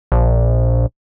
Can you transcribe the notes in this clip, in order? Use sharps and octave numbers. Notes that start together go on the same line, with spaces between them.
A#1